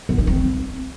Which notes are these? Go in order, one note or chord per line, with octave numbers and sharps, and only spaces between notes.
B3
D#4
C4